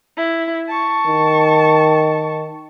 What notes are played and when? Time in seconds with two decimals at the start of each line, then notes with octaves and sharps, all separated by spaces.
0.17 E4
0.67 A5 C#6
1.07 D#3